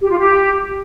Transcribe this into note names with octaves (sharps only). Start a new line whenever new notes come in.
G4
F4
G4